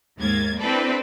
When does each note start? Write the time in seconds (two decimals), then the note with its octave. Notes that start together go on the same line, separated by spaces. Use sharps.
0.18 D#2 G#2 A#3 G#6 A6
0.59 C4 D4 E4 A4 B4 D5